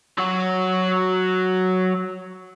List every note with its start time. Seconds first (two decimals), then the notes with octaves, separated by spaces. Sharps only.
0.18 F#3 F#4